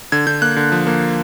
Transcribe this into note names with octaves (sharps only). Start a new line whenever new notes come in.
D3 G#6
D3 G6
A#3 F#6
D3
F3
A#3